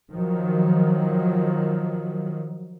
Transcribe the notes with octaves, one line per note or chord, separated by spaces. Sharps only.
D#3 F3 F#3